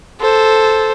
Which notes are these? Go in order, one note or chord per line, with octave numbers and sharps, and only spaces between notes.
A4 C5